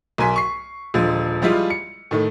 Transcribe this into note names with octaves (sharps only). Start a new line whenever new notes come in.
B1 A#4 G#5 C6 B6
C#6 C7
D#1 D3 F3 G#3
F3 G3 G#3 E4 F4
C#7
A2 D#3 A3